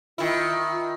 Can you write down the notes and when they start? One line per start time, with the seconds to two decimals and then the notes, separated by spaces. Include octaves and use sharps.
0.18 D#3 E4 F4